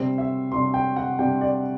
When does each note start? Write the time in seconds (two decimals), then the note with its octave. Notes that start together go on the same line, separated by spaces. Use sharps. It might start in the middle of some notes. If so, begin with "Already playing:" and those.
Already playing: C3 G3 D4 C5
0.18 E5
0.52 C3 G3 D4 C6
0.74 G5
0.96 F#5
1.19 C3 G3 D4 G5
1.41 D5